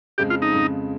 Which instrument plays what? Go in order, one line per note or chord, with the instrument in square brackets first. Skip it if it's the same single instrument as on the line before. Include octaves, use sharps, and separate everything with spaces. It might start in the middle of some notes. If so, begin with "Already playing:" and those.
[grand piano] F2 C#3 G#3 [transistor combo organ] G4
[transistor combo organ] F4
D#4
[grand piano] F2 C#3 G#3